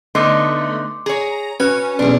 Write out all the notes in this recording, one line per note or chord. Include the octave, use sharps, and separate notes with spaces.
D3 A3 B3 D#4 C6 D6
G#4 C#5 A#5
C#4 F#4 B4 G#5
B1 E2 D4